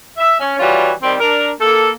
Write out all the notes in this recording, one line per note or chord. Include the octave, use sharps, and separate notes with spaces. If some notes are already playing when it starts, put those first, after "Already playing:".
E5
C#4
E3 G3 F4 F#4 C#5
D#3 G3 C4
D4 A#4
A#3 A4